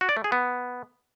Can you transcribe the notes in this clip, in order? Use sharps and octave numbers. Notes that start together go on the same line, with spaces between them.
F#4
D5
A3
G#4
B3